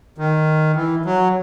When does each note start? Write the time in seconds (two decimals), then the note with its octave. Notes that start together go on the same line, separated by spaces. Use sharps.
0.18 D#3
0.76 E3
1.05 F#3